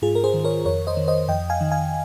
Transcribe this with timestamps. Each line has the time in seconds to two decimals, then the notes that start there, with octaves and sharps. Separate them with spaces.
0.02 G#2 F4 G#4
0.15 A#4
0.24 G#4 C5
0.34 D#3
0.44 A#4 C#5
0.65 F2 A#4 C#5
0.87 C5 D#5
0.97 D#3
1.08 C5 D#5
1.29 F2 D#5 G5
1.50 F5 G#5
1.61 D#3
1.71 F5 G#5